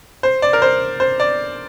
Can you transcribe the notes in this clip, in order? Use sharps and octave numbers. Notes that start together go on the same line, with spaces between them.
C5
D5
A#4
C5
C5
D5